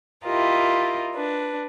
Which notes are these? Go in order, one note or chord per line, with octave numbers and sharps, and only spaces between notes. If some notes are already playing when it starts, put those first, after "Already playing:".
E4 F4 G4 A#4 D#5
D4 B4